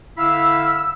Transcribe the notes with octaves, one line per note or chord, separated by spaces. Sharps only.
D3 E4 F5 B5 E6